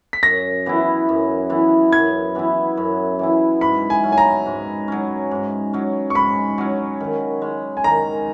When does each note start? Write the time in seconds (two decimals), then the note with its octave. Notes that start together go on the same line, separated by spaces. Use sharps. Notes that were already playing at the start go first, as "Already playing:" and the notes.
0.13 B6
0.23 F#2 A#6
0.66 E3 B3 E4
1.09 F#2
1.50 E3 B3 E4
1.93 F#2 G#6
2.35 E3 B3 E4
2.77 F#2
3.19 E3 B3 E4
3.61 G#2 B5
3.90 G#5
4.04 F#3 C#4
4.12 G#5
4.18 A#5
4.46 G#2
4.88 F#3 C#4
5.31 G#2
5.73 F#3 C#4
6.10 C#6
6.15 G#2 B5
6.58 F#3 C#4
7.00 D#3
7.42 G#3 C#4
7.77 G#5
7.84 D#3 A#5